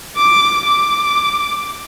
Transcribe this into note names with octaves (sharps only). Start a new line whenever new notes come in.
D6
D6